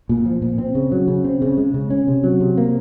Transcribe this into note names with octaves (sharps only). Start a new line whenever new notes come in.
A#2
F3
A#2
C4
C#3
F#3
C#3
C4
C#3
G#3
C#3
C#4
C3
F#3
C3
A#3